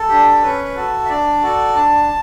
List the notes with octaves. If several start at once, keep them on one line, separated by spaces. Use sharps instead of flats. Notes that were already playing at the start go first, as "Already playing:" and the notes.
Already playing: A4
D4 G4
C#4 B4
B4
F#4 A4
E5
D4 D5
F#4 A4
D4 A5